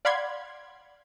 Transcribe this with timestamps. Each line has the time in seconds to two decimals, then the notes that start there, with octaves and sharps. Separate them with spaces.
0.05 D5 F5 F#5 B5 C6 G#6